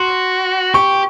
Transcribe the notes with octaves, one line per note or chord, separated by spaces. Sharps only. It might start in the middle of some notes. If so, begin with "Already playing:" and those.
Already playing: F#4 C6
G4 C#6